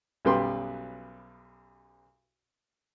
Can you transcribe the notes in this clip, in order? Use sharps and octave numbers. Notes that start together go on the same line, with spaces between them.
B1 F#2 G3 B4 G5 C6